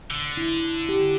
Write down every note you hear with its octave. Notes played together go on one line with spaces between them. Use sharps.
D3
E4
G4